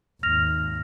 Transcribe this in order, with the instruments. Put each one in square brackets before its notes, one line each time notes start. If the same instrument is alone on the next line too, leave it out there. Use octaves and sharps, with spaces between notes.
[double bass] G#1 D#2 [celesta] F6 A#6 F7